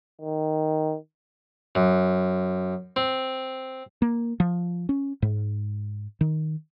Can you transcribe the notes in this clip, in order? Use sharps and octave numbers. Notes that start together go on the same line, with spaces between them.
D#3
F#2
C4
A#3
F3
C#4
G#2
D#3